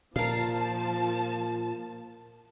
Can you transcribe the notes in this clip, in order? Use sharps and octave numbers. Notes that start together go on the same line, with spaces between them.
A#2 F3 A#4 F5 A5